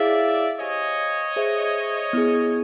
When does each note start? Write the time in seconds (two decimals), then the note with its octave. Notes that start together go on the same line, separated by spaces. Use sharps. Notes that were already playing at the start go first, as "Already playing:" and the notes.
Already playing: E4 G#4 C#5 D5 E5 F5
0.60 G4 C5 C#5 D#5 F5 G#5
1.36 G#4 C5 E5
2.13 B3 E4 G#4